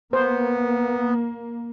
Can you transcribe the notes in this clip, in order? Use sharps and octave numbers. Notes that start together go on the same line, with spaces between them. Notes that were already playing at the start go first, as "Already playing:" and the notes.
A#3 B3 C5